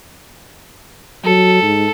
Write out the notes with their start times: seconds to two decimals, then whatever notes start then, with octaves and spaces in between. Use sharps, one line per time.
1.24 F#3 A4
1.62 G#2